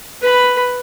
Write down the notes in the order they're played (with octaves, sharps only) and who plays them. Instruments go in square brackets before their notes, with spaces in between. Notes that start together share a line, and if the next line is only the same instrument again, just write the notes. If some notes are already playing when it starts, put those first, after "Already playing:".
[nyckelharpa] B4 B5